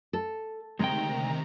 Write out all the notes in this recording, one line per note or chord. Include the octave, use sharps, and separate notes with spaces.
A4
D2 C3 D#3 G#3 G5 A#5